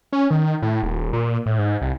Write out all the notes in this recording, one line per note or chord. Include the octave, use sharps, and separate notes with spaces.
C#4
D#3
A2
D#1
A#2
A2
G#2
C2